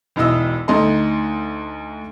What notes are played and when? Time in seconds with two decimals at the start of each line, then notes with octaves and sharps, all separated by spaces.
0.16 E1 B1 E4 D#5 E6
0.68 D2 D#4 A4 D#5 A#5 C6